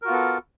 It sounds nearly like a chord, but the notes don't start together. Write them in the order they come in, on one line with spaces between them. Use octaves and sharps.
A#4 F#4 F4 B3 A4